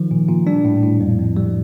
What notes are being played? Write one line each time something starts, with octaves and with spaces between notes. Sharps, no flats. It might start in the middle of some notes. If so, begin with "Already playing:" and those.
Already playing: D#3 F3
A#2
A#2
G3 D4
A2
A2
F2
F2
G3